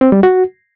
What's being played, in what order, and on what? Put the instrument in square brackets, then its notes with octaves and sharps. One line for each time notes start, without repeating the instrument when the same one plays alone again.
[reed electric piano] C4
G3
F#4